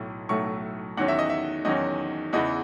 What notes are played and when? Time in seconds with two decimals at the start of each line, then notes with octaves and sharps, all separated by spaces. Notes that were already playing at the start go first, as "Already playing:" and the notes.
Already playing: B1 A2 F#3 A3
0.29 B1 A2 F#3 A3 C#6
0.97 E2 D#3 F#3 C#4 F#5
1.08 E5
1.19 D#5
1.30 E5
1.65 E2 D#3 F#3 C#4 D#5
2.33 E2 C#3 E3 B3 D#5